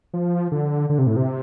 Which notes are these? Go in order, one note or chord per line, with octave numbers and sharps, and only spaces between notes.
F3
D3
D3
C3
A2
C3